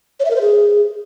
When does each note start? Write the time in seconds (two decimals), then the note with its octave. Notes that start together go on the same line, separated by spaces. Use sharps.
0.20 C#5
0.25 E5
0.30 A#4
0.36 C5
0.41 G#4